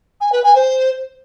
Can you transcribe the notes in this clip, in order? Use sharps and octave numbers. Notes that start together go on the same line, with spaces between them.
G#5
B4
G#5
C5